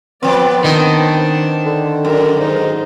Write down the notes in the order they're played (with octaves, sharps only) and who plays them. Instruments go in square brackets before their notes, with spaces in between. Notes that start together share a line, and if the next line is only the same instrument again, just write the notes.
[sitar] F3 C4 [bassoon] B3 [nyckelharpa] B4 D5
[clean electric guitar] D#3 [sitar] C4 D#5 [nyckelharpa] D4 A5
[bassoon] D3
[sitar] F#2 [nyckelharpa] A#4
[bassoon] G#2 [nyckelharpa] D#4 C5